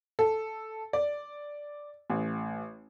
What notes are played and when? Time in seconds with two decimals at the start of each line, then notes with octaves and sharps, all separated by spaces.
0.19 A4
0.93 D5
2.10 A1